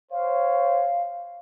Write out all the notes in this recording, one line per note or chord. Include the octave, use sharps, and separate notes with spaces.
C5 C#5 F5